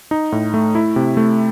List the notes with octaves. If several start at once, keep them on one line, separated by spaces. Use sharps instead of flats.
D#4
A2
A3
E4
C3
A3